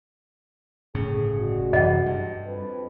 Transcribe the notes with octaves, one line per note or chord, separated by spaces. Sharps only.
G1 A2 C#3 G#4
G3 G#3 F#4
F#2 C3 E3 D#5 F#5
G2
F2 B4